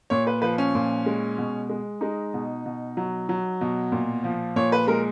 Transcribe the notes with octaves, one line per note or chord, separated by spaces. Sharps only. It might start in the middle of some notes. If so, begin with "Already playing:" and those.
A#2 C#5
B4
F3 B4
C#4
A#2
G#3
B2
G#3
G#3 D#4
B2
B2
F#3
F#3
B2
A#2
F3
A#2 C#5
B4
G#3 A#4